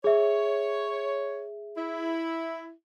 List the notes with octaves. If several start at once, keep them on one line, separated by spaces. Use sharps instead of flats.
G#4 C#5 E5
E4